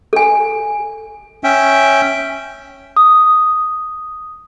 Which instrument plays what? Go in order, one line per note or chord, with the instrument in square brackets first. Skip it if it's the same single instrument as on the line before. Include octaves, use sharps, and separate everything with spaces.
[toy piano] A4 G#5
[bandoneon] C#4 E5 G5
[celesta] D#6